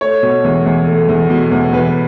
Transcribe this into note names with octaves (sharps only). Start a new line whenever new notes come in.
A3 C#5
B2
E2
E2
A3
E2
B2
E2
E2 B4